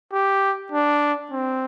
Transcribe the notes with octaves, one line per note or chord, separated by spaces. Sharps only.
G4
D4
C4